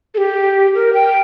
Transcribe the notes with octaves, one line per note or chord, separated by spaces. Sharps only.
A4
G4
A#4
G5